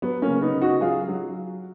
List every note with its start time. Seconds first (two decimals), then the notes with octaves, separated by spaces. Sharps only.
0.02 F#3 B3
0.22 A#3 C#4
0.28 C#3
0.41 B3 D#4
0.54 C#3
0.61 D#4 F#4
0.81 F#3 F4 G#4
1.08 F#3